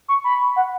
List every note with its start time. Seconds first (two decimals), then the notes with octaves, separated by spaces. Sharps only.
0.08 C#6
0.24 B5
0.56 F#5